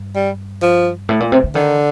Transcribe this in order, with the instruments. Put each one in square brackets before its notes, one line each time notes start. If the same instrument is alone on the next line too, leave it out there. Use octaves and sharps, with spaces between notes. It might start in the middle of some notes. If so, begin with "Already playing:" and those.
Already playing: [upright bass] G2
[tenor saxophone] G3
F3
[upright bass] A2
A#2
C3
D3
[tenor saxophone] D3 [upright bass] D#3